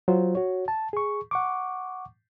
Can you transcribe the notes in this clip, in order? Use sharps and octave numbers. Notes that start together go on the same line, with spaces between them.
F#3 F4 C5
F#4 C#5
A5
G#4 C#6
F#5 C#6 D6